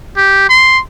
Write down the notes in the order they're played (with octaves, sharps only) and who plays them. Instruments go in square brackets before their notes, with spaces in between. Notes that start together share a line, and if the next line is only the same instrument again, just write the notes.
[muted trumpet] G4
C6